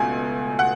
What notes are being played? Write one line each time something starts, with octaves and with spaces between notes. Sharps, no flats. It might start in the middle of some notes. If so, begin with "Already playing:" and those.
Already playing: C#2 B2 A3 G#5
F#5